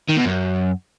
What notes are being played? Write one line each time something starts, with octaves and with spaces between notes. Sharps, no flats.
D#3
B2
F#2